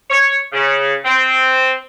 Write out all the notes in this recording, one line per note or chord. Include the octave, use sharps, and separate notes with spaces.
C#5
C#3
C4